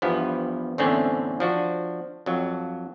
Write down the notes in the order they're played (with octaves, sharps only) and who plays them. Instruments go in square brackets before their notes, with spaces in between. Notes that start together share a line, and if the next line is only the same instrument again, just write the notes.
[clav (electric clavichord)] E2 G2 F3 B3
E2 A2 D3 A3 C4 C#4
F3 D4 F#4
F2 F#3